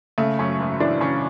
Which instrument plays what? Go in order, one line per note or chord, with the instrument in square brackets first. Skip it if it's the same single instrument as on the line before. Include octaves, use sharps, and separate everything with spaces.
[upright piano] C#3 A3
F#2 C#4
G#1
E3 D4
C#3 C#4